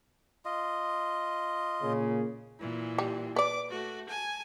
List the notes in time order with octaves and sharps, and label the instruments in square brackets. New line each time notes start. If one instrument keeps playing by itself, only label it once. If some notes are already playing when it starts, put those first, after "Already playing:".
[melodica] F4 D#5
[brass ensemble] A#2 C#3 A#3
[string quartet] A#2 E3
[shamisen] G3
[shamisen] B4 D5 [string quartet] D6
[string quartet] A3 F#4
G#5 A5